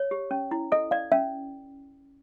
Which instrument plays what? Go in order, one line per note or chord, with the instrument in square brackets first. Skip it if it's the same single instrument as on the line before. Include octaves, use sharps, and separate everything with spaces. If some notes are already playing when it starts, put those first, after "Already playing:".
Already playing: [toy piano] C#5
G4
C#4
E4
[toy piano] A4 [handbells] D#5
[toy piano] D5 [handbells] F5
[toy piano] C#4 [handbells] E5